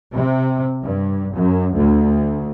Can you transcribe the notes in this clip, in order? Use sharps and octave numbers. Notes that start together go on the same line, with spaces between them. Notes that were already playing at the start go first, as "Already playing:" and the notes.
C3
G2
F#2
D2